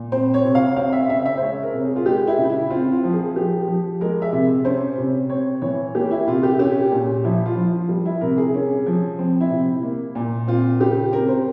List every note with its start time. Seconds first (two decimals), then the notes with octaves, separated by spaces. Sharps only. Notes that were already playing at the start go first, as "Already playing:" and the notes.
Already playing: A#2
0.12 C4 C5
0.34 C#5
0.45 C3
0.55 F5
0.76 C4 F5
0.93 E5
1.08 C#3 E5
1.25 E5
1.37 C5
1.41 G#3 C#5
1.63 A#4
1.74 C3
1.85 G#4
1.96 F4
2.06 G#3 G4
2.27 E4
2.38 C#3
2.49 E4
2.70 C4 F4
2.92 F4
3.04 F3
3.14 G#4
3.36 F3 G4
3.68 F3
4.01 G#3 A#4
4.22 E5
4.33 C3
4.65 C#4 C5
4.98 C3
5.30 C4 C#5
5.62 E3 C#5
5.95 A#3 G4
6.11 E4
6.28 C3 F4
6.43 G4
6.59 C#4 G4
6.92 A#2
7.24 F3 E4
7.46 F4
7.57 F3
7.67 F4
7.89 G3
8.06 E4
8.21 C3 A#4
8.38 G#4
8.54 C#4
8.86 F3
9.19 C4
9.40 E4
9.51 C3
9.83 A#3
10.15 A#2
10.47 C4 F4
10.80 C#3 G4
11.12 C4 A#4
11.29 C5